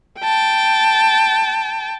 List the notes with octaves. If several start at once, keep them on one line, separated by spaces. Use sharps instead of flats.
G5 A5